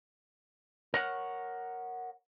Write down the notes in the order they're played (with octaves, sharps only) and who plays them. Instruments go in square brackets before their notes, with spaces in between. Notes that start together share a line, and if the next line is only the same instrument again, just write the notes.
[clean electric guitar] A#4 C#5 F#5